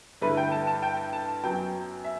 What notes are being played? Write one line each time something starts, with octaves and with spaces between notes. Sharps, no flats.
G2 D3 A3 E4 B4
G5
A5
A5
G5
A5
F#2 F#3 B3 G5
E5